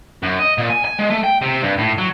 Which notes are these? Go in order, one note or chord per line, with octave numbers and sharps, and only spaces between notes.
F#2
D#5
A#2
G#5
G#5
G#3
A3
G5
C3
G2
A2
F#3